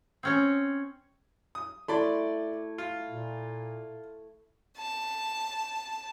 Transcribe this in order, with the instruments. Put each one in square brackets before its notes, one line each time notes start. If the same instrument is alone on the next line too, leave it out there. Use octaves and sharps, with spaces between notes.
[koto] C4 C#4 C#5
[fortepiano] D#6
[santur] A3 E4 [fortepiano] D5 B5 C6
[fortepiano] F4
[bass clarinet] A#2
[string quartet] A5